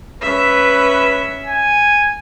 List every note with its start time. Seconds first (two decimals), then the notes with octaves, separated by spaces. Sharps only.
0.21 C#4 B4 E5
1.46 G#5